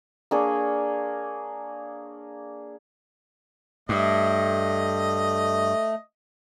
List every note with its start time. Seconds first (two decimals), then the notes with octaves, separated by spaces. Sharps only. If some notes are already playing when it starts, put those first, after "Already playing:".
0.31 A#3 D4 G#4 C#5
3.89 G2 A3 D#5